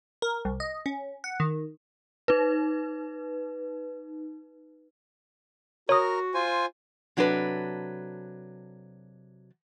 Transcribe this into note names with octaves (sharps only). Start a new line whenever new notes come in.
A#4
C2
D#5
C#4
F#5
D#3
D#4 B4
F#4 A#4 C#5 D#6
F4 C5 G#5
C3 F#3 D4 A4 B4